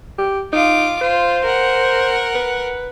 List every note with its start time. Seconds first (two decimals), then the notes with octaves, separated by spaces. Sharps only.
0.18 G4
0.53 D#4 F4 D6
1.02 F4 C5
1.45 A#4 F#5
2.35 B4